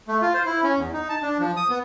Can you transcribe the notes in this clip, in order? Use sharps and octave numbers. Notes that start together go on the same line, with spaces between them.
A3
F4
C5
E4
C#4
E2
D#4
A5
D4
F3
D#6
B3